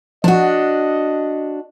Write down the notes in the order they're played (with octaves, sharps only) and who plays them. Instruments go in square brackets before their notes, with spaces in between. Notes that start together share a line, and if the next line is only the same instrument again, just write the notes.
[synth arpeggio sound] F3 [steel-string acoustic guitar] D4 F#4 [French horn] D#5